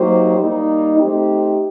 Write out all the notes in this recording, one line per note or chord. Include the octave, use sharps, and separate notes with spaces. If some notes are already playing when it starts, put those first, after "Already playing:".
Already playing: F#3 A#3 D#4 G4 C5
G3 A#3 D#4
A3 C4 D#4 G4